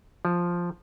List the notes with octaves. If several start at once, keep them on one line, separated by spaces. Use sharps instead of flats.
F3